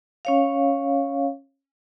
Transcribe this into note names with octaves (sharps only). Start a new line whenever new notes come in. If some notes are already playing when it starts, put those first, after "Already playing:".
C#4 C#5 F5